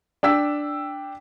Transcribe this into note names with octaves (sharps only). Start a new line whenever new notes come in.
D4 G5 E6 B6